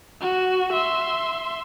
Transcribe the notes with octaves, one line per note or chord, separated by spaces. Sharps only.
F#4
E5 C6